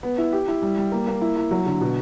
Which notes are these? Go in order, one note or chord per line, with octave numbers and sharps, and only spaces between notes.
B3
E4
G4
E4
G3
G3
A#3
A#3
E4
E4
F#3
D3
B2